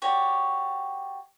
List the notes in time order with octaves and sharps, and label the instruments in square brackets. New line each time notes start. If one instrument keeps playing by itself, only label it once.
[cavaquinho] F#4 G4 C#5 D5